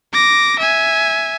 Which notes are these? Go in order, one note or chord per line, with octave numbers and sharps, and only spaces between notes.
D6 A#6
E5 G#5